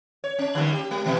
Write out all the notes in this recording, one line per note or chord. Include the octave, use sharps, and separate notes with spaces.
C#5
C#4
D3 G3 A#3
G4
G#3
B2 E3